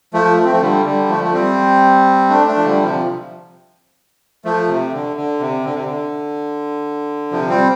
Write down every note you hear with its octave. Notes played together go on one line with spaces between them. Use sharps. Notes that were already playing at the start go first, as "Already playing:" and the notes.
F3 A3
A3
C4
F3 A3
D3 G3
D3 G3
F3 A3
A3
G3 C4
A3 D4
A3 D4
F3
D3 G3
C3 F3
F3 A3
C3
D3
D3
C3
D3
C3
D3
C3 F3
G3 C4